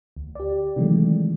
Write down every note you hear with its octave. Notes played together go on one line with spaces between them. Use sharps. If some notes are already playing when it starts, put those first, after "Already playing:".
D2
G4 D5
C3 D#3 E3 F#3 G#3 A3